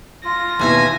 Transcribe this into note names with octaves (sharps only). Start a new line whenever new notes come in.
F4 A#6
D#2 B2 E3 C#4 E5 G#5